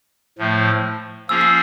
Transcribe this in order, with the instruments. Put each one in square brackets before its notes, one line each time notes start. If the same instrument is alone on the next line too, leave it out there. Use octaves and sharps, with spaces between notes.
[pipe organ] A2 F3 A3
[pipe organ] F3 A#3 C#4 F4 G#4 [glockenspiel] E6
[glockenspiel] E6